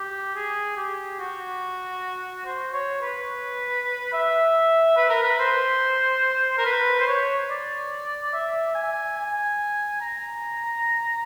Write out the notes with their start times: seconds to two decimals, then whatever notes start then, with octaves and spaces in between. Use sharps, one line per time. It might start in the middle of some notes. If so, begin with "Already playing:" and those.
Already playing: G4
0.36 G#4
0.77 G4
1.20 F#4
2.46 C5
2.74 C#5
3.02 B4
4.13 E5
4.97 B4
5.10 A#4
5.23 B4
5.39 C5
6.58 A#4
6.65 B4
7.00 C5
7.07 C#5
7.50 D5
8.33 E5
8.75 G#5
9.17 G#5
10.01 A#5